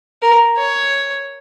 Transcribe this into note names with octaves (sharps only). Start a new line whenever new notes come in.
A#4
C#5